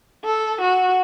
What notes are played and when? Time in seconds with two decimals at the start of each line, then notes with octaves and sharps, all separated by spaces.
0.24 A4
0.61 F#4